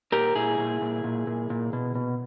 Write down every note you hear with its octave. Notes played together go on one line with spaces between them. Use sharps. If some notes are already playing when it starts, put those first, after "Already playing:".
A#2 G4 A#4
A#2 E4 G#4
A#2
A#2
A#2
A#2
A#2
B2
B2